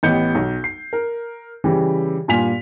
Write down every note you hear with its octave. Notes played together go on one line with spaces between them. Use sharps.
A1 B3 G4 D#5 G6 C#7
B1
C7
A#4
C#3 E3 G3 G4
G2 A#2 F4 G#5 B6 F7